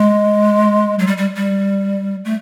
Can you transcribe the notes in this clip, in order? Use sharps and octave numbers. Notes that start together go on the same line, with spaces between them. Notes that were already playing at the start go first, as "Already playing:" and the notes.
Already playing: G#3
F#3
G3
G3
G3
A3